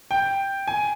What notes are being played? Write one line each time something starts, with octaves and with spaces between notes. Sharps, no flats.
G5
G#5